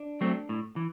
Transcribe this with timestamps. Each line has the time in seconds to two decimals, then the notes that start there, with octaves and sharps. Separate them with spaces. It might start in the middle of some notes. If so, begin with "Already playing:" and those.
Already playing: D4
0.21 F#3 A3 C4
0.49 A2
0.76 E3